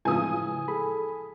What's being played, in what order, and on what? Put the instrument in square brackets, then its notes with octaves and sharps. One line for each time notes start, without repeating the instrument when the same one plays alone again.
[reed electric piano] A2 C#3 G#3 [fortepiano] E3 F3 [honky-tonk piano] G#5 D#6
[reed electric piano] G#4 A4 B5